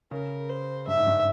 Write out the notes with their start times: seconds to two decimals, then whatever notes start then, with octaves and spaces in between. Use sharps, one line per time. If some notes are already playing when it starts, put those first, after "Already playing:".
0.11 C#3 A#4
0.49 C5
0.87 G2 E5
0.97 G#2
1.07 G2